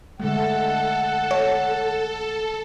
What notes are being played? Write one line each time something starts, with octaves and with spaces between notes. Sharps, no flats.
D3 G#3 A3 A4 F#5
C#5